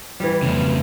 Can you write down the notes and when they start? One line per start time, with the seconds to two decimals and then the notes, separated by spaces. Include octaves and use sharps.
0.20 E3 G3
0.42 F2 C#3